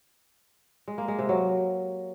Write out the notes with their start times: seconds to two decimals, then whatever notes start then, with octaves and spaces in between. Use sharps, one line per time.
0.88 G#3
0.98 A#3
1.08 G#3
1.19 C3
1.29 F#3